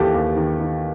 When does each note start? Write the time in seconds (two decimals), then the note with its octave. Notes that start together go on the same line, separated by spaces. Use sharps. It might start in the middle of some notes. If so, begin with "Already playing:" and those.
Already playing: D#2 E3 G4 A4
0.14 D#2
0.37 D#3
0.59 D#3